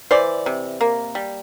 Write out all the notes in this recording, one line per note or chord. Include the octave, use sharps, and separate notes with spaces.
E3 C5 D5
C3
A#3
G3